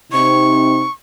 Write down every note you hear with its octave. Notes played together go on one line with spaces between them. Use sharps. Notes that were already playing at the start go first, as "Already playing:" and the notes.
C3 C4 D#4 C#6